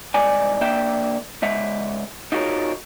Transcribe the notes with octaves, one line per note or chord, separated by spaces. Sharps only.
C2 G#2 D5 G#5
A#3 D4 E5 G5
C#2 G#3 E5 F#5
D#4 F4 F#4 G#4 A#4 C#5